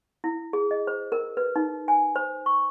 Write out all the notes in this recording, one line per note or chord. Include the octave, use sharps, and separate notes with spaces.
E4
G#4
D#5
C5
A#4
B4
D#4
G#5
C5
C#6